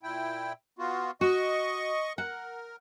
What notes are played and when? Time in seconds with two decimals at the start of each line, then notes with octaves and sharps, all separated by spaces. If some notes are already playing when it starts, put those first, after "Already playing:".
0.03 A#2 E4 G5
0.79 B3 F4 F#4
1.21 F#4 D#5 C#6
2.18 A#4 F#5